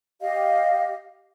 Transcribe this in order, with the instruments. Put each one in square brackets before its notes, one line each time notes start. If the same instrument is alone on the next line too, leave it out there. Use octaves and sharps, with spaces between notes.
[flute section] G4 D#5 F5